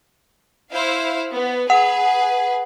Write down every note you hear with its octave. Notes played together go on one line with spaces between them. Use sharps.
E4 C5 F5
B3
G#4 B4 F#5